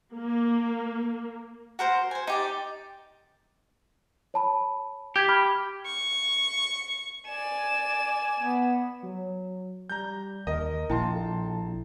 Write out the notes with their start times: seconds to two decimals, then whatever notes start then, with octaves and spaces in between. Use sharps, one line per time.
0.11 A#3
1.79 F#4 A#4 C5
2.11 C5 G#5
2.27 D#4 G4 D5
4.34 C#5 A5 B5
5.16 G4 G6 G#6 B6
5.29 B5 D6 F6
5.86 C#6
7.27 D5 G#5 E7
8.40 B3
9.03 F#3
9.90 G3 A#5 G6
10.47 D#2 A#4 D#5
10.90 A#1 A#3 E4 G5 A5 C6
11.14 A4